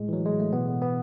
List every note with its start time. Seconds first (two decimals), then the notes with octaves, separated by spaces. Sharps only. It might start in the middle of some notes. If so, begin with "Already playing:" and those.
Already playing: A2 G#3
0.09 E3 F#3
0.26 G#3
0.40 A3
0.53 B2 B3
0.82 B3